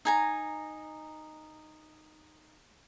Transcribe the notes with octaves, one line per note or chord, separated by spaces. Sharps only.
D#4 G#5 A#5